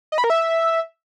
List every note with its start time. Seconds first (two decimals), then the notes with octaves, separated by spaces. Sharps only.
0.12 D#5
0.18 B5
0.24 A#4
0.30 E5